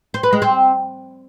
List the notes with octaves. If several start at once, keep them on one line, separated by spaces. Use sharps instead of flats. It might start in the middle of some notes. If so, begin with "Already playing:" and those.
C5
B4
G#3
C4